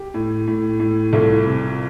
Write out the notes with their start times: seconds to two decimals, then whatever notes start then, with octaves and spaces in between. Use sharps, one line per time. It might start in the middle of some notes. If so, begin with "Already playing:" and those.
Already playing: G4
0.14 A2
0.47 A2
0.80 A2
1.13 C2 F4 A4
1.47 C3